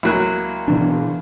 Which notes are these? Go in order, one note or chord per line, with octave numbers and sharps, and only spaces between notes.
C#2 F#3 A#3 E4 F#6
B2 E3 D4